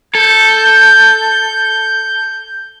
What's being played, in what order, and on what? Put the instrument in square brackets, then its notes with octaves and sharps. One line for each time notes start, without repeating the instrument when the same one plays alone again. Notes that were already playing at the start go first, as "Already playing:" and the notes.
[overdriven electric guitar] A4 [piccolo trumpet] G6